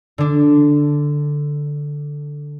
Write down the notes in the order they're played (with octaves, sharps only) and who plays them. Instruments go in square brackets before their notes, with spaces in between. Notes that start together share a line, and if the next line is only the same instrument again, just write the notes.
[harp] D3 D4